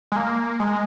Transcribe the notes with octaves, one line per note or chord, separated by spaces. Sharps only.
G#3
A#3
G#3